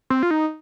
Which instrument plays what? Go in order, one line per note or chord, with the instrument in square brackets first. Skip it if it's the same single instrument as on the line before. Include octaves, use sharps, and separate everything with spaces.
[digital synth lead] C4
F4
D#4